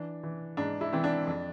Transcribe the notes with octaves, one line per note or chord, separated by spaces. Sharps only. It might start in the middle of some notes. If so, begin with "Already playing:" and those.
Already playing: E3 D4
E3
G#2 D4
E4
E3 C4
D4
F2